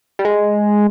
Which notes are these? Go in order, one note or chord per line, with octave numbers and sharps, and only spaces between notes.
G3
G#3